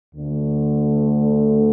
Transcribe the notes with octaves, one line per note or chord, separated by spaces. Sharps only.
D2 D3 A3